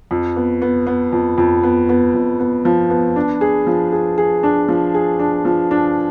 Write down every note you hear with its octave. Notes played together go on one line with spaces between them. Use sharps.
F2
B3
B3
B3
F2
F2
B3
B3
F2
B3
F3
B3
D4
G#4
F3
G#4
G#4
D4
F3
G#4
D4
F3
D4